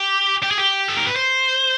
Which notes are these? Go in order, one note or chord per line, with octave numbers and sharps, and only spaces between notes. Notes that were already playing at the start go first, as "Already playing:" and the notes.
Already playing: G4
G4
G#4
G4
A4
A#4
B4
C5